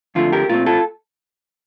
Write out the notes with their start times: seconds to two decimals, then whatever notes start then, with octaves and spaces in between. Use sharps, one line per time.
0.15 F2 D3 F3 A3 F4
0.32 G4 A#4
0.49 A#2 A3 C4 F4
0.66 F4 A4